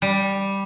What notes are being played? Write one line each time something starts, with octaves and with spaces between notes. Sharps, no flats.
G3